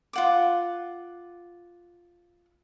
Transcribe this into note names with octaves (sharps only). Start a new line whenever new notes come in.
F4 F#5 D6